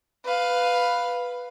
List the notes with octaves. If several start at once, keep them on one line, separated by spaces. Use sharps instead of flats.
B4 F5